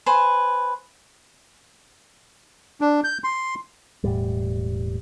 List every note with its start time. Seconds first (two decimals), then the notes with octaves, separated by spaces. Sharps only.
0.06 B4 C5 G#5
2.81 D4
3.04 G6
3.24 C6
4.04 E1 A2 G3